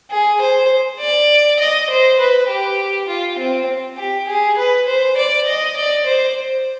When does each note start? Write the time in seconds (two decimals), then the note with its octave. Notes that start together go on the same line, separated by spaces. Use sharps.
0.11 G#4
0.41 C5
1.00 D5
1.59 D#5
1.90 C5
2.19 B4
2.49 G4
3.08 F4
3.38 C4
3.98 G4
4.28 G#4
4.57 B4
4.87 C5
5.17 D5
5.46 D#5
5.76 D5
6.06 C5